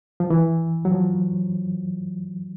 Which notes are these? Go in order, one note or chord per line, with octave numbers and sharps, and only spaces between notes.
F3
E3
F#3
F3